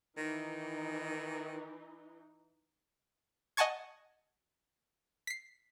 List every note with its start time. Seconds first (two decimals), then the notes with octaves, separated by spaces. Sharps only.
0.18 D#3 E3 D#4
3.57 D#5 F#5 G#5 A5 C#6 G#6
5.27 B6 C7